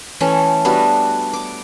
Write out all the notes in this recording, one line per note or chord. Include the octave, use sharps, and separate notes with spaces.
E3 A3 C#4 A4
G3 B3 D4 F#4
D6